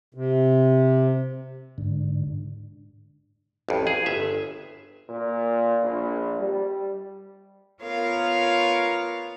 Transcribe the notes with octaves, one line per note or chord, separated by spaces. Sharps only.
C3
G#2 D3
A1 F2
G#4
G1 E5
A#2
A#1
G3
B3 F4 A#4 C#5 F5